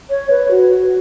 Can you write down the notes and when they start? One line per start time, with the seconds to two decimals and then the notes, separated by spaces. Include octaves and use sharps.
0.10 C#5
0.30 B4
0.51 F#4